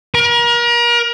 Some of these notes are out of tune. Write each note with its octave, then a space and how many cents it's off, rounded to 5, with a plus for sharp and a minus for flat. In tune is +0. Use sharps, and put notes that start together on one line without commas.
A#4 +35